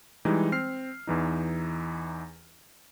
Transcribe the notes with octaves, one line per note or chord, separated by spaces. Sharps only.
E3 G3 G#3 D#4
C4 F6 C7
E2 E3 D#4